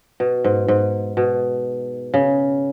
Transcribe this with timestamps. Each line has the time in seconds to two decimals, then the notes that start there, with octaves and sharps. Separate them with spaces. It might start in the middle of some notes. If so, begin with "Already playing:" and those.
0.20 B2
0.45 G#2
0.68 G#2
1.17 B2
2.14 C#3